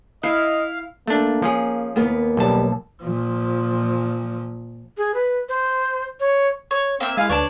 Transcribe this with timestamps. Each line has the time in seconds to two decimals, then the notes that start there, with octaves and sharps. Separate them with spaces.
0.23 E4 D#5 F5
1.07 A3 A#3 D4
1.42 F3 C#4 G#4
1.96 D#2 A#3 B3
2.37 B1 G3 A5
3.02 A#2 F3
4.97 G#4
5.14 B4
5.49 C5
6.20 C#5
6.71 C#5
7.00 A#3 C4 E5
7.17 G#3 E4 G#4 F5 G#5
7.30 D2 D4 B4 C#5 D5 A5